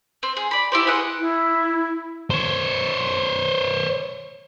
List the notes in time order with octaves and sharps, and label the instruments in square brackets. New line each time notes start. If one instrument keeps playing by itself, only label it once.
[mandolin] C4
G#4
D5 B5
E4 G4 C5
G#4 B4 D#5 F#5
[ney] E4
[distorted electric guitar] C5 C#5